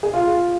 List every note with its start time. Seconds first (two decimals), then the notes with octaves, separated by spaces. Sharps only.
0.03 G#4
0.13 F4